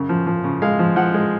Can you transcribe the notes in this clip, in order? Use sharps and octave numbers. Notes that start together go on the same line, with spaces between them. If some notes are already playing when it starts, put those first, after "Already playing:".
Already playing: F#2 C#3
F3
F3
C#3
G#3 F5
F3
F3 F#5
G#3